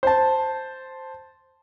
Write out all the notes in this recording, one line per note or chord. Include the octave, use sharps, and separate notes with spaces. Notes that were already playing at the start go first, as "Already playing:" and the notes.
C5 A5